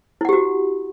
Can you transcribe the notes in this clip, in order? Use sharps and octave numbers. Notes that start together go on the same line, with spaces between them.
E4 F#4 G4 F#5